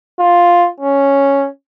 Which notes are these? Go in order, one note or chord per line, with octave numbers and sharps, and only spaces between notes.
F4
C#4